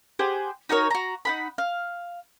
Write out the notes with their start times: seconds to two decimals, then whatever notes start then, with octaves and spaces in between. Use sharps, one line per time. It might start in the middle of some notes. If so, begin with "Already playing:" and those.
0.19 G4 G#4 C5 F#5
0.69 D#4 F#4 A#4 C#5
0.91 F#4 A#5
1.25 D#4 F#5 B5
1.58 F5